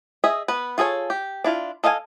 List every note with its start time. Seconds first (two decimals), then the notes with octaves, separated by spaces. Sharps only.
0.24 G#4 D#5 E5
0.48 B3 B4
0.78 F4 G#4 A4 C#5
1.10 G4
1.44 D4 E4 F4
1.84 A4 D#5 F5 F#5 G#5